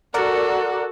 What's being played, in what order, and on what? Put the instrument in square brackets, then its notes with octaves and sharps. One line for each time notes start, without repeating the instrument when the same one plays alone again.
[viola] F#4 A4 [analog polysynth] A#4 D5 F#5